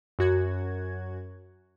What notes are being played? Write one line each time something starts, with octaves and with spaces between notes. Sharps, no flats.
F#2 F#4 G#6